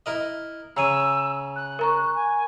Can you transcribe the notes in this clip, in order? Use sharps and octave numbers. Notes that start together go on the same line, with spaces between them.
E4 A#4 D#5
C#3 C#5 A#5 E6 D#7
F#6
A#4 A#5 C#6
G#5